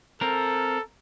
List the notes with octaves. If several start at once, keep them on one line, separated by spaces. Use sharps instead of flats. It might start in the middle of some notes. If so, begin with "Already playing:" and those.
C4 A4 A#4